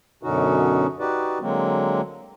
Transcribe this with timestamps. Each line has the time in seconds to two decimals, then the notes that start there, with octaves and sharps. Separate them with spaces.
0.23 F#2 B2 D3 C#4 D#4 F#4
0.99 D#4 F#4 G4 B4 D5
1.41 D3 F#3 G#3 A#3 C4